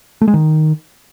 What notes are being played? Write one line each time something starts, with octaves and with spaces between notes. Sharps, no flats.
A3
G#3
D#3